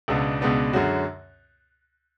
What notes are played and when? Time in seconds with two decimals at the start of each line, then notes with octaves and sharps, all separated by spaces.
0.08 C#2 B2 G#3 B3 D4
0.41 C#2 B2 G#3 B3 D4
0.73 F#2 D3 G#3 C#4 F#4